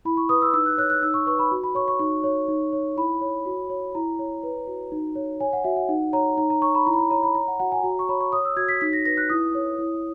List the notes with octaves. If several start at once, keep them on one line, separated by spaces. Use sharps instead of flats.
E4 B5
C#6
B4 D#6
E6
D#4 E6
F#6
C#5 F#6
F#6
D#4 E6
C#6
B4 C#6
B5
F#4
B5
C#5 C#6
C#6
D#4 C#6
C#5
D#4
C#5
E4 B5
C#5
F#4
C#5
E4 A#5
C#5
B4
F#4
D#4
C#5
C#5 G#5
F#5
F#4 E5
F#5
D#4 F#5
C#5 A#5
D#4 A#5
A#5
C#5 C#6
B5
E4 A#5
B5
A#5
C#5 A#5
B5
C#5 A#5
F#5
F#4 F#5
G#5
F#4 A#5
C#6
C#5 B5
C#6
C#5 D#6
E6
F#4 G#6
B6
D#4 B6
A#6
B4 A#6
F#6
E4 D#6
C#5
E4